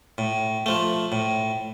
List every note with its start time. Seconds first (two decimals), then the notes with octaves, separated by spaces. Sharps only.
0.18 A2
0.66 F3 A3
1.12 A2